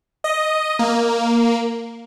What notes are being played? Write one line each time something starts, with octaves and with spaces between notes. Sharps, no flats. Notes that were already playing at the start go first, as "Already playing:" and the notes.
D#5
A#3